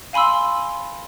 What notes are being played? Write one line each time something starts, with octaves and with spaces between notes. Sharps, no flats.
F5 G#5 B5 C6 E6